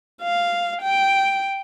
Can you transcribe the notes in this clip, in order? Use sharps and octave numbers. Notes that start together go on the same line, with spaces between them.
F5
G5